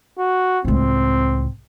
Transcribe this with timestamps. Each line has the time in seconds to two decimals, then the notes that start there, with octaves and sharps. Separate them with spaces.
0.19 F#4
0.65 C#2 A2 C4